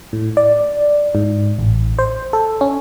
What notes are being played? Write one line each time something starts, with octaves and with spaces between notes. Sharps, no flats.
A2
D5
G#2
A1
C5
A4
C#4